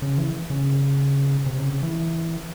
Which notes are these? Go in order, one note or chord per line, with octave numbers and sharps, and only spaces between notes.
C#3
E3
C#3
C3
C#3
E3